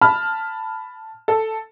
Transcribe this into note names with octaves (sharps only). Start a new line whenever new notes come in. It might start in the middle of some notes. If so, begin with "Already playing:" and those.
A5 B5 F6
A4